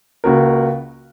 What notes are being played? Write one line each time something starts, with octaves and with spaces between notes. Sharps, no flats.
C#2 C#3 A#3 F#4 A#4